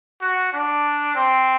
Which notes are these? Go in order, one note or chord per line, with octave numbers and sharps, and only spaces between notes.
F#4
D4
C4